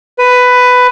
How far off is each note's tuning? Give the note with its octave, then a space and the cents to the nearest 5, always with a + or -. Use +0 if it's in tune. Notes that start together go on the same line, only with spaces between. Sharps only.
B4 +10